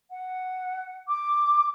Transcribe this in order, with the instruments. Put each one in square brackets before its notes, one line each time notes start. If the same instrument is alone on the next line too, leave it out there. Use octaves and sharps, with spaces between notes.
[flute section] F#5
D6